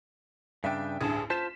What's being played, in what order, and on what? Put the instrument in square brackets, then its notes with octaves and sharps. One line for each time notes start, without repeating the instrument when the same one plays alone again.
[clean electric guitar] G2 C#3 D4 [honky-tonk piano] E5 G5
[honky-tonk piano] A1 D2 G2 [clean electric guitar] G#4 A5
[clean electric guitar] F4 C5 A5 [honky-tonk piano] B6 E7